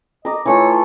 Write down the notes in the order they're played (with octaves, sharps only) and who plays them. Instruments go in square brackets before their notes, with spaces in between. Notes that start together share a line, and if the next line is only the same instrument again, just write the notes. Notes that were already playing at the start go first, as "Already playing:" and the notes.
[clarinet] D#5 [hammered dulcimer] A#5 D6
[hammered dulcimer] E3 A3 F4 [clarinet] C#5